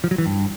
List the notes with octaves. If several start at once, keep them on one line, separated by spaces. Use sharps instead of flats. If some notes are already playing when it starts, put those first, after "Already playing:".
F3
F#3
E3
G2